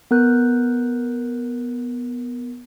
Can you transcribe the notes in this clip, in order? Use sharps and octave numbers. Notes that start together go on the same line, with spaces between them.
B3 A#4 F#6 G6